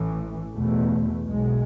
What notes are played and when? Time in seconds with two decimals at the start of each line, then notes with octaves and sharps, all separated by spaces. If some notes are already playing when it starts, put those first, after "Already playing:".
Already playing: A1 A2 E3
0.53 E2 B2 A3
1.26 B1 B2 G#3